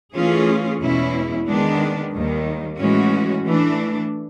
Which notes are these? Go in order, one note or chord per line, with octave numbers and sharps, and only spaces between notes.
E3 A3 C#4 F4 G#4
E2 B2 G#3 C#4 E4
D#3 G#3 B3 D4
D#2 D#3 G3
A2 E3 G#3 C#4 F#4
E3 A3 D4